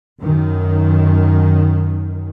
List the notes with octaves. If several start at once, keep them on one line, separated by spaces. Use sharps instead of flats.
F#2 D#3